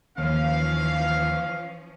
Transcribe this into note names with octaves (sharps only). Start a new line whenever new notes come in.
D#2 E3 F3 C#4 F5